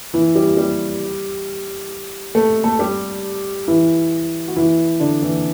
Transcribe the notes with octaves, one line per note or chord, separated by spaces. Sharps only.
E3 E4
G3 G4
G3 G4
A3 A4
A3 A4
G3 G4
E3 E4
F#4
E3 E4
D3 D4
E3